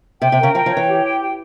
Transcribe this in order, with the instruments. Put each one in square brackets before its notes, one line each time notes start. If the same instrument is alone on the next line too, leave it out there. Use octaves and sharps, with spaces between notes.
[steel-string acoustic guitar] C3 [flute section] G5
[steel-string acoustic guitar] C3
[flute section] A#4
[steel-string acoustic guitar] C#3
[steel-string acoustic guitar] F3 [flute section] G5
[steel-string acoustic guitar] F3
[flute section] C#5
[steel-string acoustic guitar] E3
[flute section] G4
G5
G5